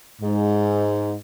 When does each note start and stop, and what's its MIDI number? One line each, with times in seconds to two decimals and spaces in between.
0.22 1.14 44